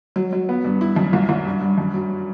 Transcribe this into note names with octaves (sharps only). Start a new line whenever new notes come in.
F#3
F#3
B3
G2
E4
F#2
C2
C2
G2
G2
F#2
F#3